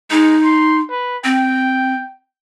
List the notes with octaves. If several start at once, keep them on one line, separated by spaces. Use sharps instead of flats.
G#3 D#4
C6
B4
C4 G5